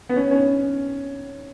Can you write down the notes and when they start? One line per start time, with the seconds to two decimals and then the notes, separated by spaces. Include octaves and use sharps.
0.09 B3
0.16 C#4
0.31 C#4